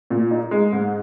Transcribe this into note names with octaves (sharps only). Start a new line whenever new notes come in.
A#2
D#4
G#3
G#2